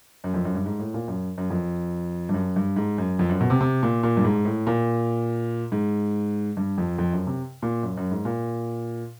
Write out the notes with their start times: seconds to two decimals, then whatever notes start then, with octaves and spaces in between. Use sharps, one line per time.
0.24 F#2
0.34 F2
0.45 F#2
0.55 G2
0.66 G#2
0.79 A2
0.94 A#2
1.08 F#2
1.38 F#2
1.50 F2
2.29 G2
2.34 F#2
2.56 G2
2.76 G#2
2.98 F#2
3.19 F2
3.30 F#2
3.41 B2
3.50 C3
3.61 C3
3.83 A#2
4.03 A#2
4.17 G2
4.24 G#2
4.45 A2
4.67 A#2
5.72 G#2
6.57 G2
6.78 F2
6.98 F2
7.13 F#2
7.27 C3
7.62 A#2
7.83 F#2
7.97 F#2
8.11 G#2
8.25 A#2